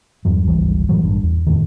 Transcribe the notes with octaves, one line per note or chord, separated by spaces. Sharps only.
E2 G2 F#3
G#1 D2 E3 G3
A2 E3 F#3
A1 G2
E2
F2 A2 D#3